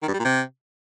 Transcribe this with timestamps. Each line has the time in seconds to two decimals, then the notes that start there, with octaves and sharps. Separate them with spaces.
0.02 D#3
0.08 G2
0.14 G3
0.19 A#2
0.25 C3